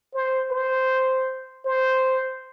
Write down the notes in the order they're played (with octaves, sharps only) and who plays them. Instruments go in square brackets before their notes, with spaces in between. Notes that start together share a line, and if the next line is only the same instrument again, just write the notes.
[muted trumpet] C5
C5
C5